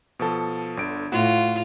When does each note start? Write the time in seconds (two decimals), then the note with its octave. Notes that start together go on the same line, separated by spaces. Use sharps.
0.19 B2 F3 A4
0.77 G1 D3 D7
1.12 A2 F4 F#4